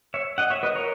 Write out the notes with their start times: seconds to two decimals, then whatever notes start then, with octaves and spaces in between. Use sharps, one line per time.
0.14 C#5 E5
0.38 D#5 F#5
0.50 C#5 E5
0.63 B4 D#5
0.75 A#4 C#5